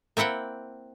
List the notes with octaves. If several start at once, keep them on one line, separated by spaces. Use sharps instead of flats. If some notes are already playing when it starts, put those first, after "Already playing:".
A#3 C4 E4 F#5 G5